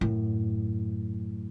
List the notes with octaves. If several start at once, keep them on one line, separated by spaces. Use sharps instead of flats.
F#2 A2